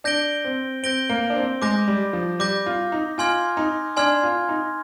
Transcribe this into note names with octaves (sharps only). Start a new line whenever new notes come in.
D4 G6 A#6 D7 G7
C4
C4 G6 A#6 D7 G7
A#3
D4
C4
G#3 D6 G6 A#6
G3
F3
G3 D6 G6 A#6
F4
D#4
F4 G#5 C6 F6 G#6
D#4
D4 G#5 C6 F6 G#6
F4
D#4